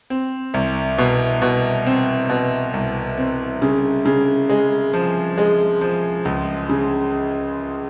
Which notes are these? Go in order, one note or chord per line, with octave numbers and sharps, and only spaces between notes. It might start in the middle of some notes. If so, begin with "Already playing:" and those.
C4
C2
B2
B2
C4
B2
C2
C4
C#3
C#3
G#3
F3
G#3
F3
C#2
C#3